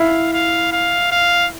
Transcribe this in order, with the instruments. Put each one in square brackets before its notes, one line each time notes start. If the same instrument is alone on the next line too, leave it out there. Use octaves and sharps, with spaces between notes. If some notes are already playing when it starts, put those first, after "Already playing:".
Already playing: [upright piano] E4 [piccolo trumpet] F5
[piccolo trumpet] F5
F5
F5